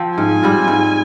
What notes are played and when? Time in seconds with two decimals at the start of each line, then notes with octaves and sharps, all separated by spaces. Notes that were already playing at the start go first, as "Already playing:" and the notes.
Already playing: F3 C4
0.18 G#2 G#5
0.42 G3 C4 F4
0.68 G#2